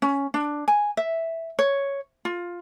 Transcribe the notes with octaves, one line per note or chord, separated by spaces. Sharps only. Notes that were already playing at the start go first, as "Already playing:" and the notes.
C#4
D4
G#5
E5
C#5
F4